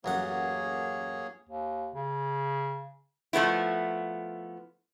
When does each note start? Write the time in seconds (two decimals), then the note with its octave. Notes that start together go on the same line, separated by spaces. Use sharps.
0.04 A1 F#2 A#3 G#4 C#5 F#5
1.49 D#2
1.95 C#3
3.33 F3 A3 B3 E4